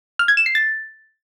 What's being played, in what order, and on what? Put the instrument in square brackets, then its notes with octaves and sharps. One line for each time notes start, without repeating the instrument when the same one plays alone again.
[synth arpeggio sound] F6
G#6
E7
C7
A6